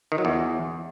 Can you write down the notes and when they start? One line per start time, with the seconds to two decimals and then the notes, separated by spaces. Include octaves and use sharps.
0.12 D#3
0.18 F#3
0.25 E2